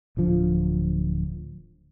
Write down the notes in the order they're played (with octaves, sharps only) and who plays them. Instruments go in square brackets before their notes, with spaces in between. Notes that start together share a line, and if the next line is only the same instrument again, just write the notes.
[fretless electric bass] D1 D3 F3